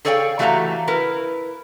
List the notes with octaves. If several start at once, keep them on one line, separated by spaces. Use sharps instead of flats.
G#4 A4 C#5 D5 F5 G5
E3 A3 F#4 G4 F5 A#5
E4 A#4 B4